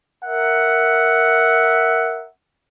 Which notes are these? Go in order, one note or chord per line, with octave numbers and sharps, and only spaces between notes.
A#4 E5 F#5